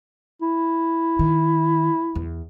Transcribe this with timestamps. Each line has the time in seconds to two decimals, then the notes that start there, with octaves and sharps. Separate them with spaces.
0.41 E4
1.19 D#3
2.15 E2